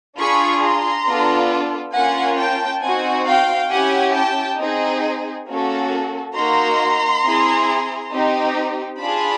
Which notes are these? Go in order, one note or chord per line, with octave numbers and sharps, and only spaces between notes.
D4 F4 G#4 B5 C#6
A#5 C6
B3 D4 F4 A4
A#3 C#4 F4 F#5 G#5
G5 A5
C4 D#4 F#4 F#5 G#5
F5 G5
C#4 E4 G4 F#5 G#5
G5 A5
C4 D#4 G#4
A#3 C#4 F#4 A4
A#3 D#4 F#4 A#5 C6
C4 E4 G#4
C4 D#4 G4
D4 F4 G#4 A5 B5